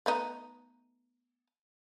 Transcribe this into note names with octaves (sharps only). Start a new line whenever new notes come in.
A3 B3 D#4